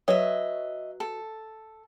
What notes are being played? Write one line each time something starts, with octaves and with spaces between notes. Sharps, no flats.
F#3 B4 C#5 D#5 E5
A4